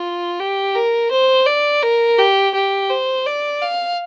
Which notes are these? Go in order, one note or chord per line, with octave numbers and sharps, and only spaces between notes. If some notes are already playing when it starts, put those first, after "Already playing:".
Already playing: F4
G4
A#4
C5
D5
A#4
G4
G4
C5
D5
F5